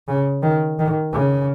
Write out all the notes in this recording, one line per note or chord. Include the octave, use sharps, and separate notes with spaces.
C#3
D#3
D#3
C#3